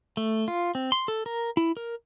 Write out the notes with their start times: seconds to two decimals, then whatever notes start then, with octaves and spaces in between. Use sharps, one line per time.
0.17 A3
0.48 F4
0.75 C4
0.92 C6
1.08 A4
1.26 A#4
1.57 E4
1.77 A#4